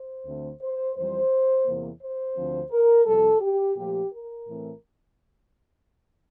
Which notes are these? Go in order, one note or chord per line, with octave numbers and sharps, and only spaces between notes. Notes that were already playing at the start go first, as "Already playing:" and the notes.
Already playing: C5
D2 D3 A3 C4
C5
F2 E3 G3 C5
E2 C3 E3 A#3
C5
D2 D3 F3 C4
A#4
F2 C3 G3 A4
G4
A#2 F3 A3 G4
A#4
A2 E3 A3 C4